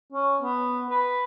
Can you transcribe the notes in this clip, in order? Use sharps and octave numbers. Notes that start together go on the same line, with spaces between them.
C#4
B3
B4